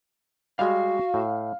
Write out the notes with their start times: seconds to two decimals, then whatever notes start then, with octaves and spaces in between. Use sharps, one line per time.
0.59 G3 G#3 F#4 F5
1.14 A2